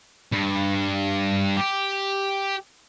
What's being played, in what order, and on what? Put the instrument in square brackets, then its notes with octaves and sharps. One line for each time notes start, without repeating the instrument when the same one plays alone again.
[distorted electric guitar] G2
G4